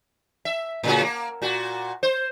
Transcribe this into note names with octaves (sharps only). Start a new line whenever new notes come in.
E5
A2 C#3 F#4
A#3
A#2 F#4
C5